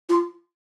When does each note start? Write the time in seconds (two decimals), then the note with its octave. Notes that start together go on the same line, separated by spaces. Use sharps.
0.09 F4